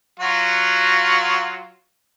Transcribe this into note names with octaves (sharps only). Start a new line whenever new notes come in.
F#3 F4 F#4